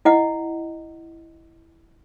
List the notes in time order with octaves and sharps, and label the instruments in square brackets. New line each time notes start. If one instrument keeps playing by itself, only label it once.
[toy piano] E4 D#5 F#5